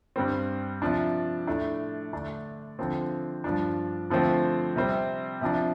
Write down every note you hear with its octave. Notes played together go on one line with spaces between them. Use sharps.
G2 G3 C4
C3 F3 D4
A2 A3 D4
D3 A3 D4
D3 F3 C4
G2 F3 D4
D3 F3 A3 C4
C3 G3 C4
C3 F3 D4